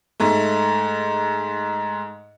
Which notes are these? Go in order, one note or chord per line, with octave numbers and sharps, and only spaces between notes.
G#2 A3